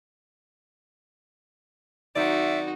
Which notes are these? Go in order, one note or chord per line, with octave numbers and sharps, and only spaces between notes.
D#3 F#3 C4 D#4 F#4 D5 E5